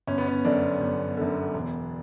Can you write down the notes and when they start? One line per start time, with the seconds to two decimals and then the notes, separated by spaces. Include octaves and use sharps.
0.07 G1 C#4
0.18 B3
0.27 C#4
0.45 F#2 D3 D4
0.81 G1
1.17 F#2 D3
1.54 E1